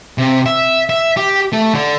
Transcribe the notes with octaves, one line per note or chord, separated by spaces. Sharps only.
C3
E5
E5
G4
A3
D3